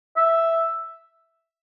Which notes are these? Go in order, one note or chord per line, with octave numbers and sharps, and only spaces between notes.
E5